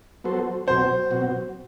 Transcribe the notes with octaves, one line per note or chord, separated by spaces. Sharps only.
F#3 B3 F#4 A4 C5
B2 F#3 C4 F#4 C5
B2 F#3 C4 F#4